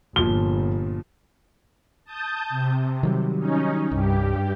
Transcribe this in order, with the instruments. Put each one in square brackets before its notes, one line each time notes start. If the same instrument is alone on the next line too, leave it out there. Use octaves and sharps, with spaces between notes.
[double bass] G1 [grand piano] A#2 F3 [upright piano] G7
[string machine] A5 D#6 G6
C3
[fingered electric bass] D#3 F#3 G3
[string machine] C#4 D#4
[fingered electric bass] C2 [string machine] G2 G4